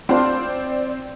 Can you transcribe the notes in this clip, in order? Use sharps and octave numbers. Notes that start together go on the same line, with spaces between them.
C4 D4 F4 C5 D5